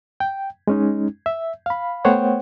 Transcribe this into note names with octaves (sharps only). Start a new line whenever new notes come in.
G5
G#3 C#4 D#4
E5
F5 B5
A3 B3 C5 C#5 F#5 G5